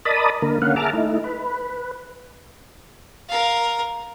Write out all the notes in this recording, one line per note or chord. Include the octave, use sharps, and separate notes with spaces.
A#4 D5 D#5 A5 B5 D#6
D3 A#3 A#4
D3 A#3 C#4 F5 F#5
G#4 E5 A5 A#5 D6 F6
A3 D#4 E4
B4
A#4 F5